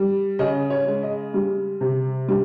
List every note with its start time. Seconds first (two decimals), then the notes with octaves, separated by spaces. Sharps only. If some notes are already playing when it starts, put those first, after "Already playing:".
Already playing: G3
0.39 C#3 D#5
0.70 C#5
0.87 G#3
1.03 D#5
1.34 G3
1.81 C3
2.28 G3